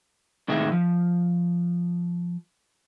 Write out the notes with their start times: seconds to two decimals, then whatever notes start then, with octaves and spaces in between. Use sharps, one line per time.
0.48 A2 C3 D#3 G#3 E5
0.72 F3